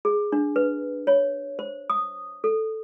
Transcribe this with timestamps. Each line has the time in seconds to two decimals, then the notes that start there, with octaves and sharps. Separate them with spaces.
0.05 G#4
0.32 D4
0.56 B4
1.07 C#5
1.59 C5
1.90 D#6
2.44 A4